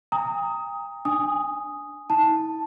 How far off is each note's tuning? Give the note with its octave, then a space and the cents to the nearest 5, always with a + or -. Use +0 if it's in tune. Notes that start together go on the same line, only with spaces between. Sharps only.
G5 +40 A#5 -20 D#6 +15
D4 +0 G#5 +0 D#6 +0
E4 -45 A5 +0